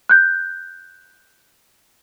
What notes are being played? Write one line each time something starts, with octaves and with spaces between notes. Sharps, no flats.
F#6 G6